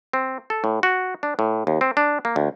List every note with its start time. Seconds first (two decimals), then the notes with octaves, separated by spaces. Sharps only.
0.13 C4
0.50 A4
0.64 A2
0.83 F#4
1.23 D4
1.39 A2
1.67 D#2
1.81 C4
1.97 D4
2.25 A#3
2.36 D2